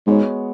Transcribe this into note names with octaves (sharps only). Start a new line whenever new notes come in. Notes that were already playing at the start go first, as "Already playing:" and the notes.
G#2 G#3 B3 F#4 C#5